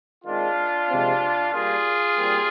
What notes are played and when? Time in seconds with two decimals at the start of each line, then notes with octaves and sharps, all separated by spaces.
0.25 D#3 G#3 C4 D4 F4
0.89 C3 F3 G#3 C4
1.52 A#2 G3 A#3 F4 G#4
2.16 A#2 G3 C4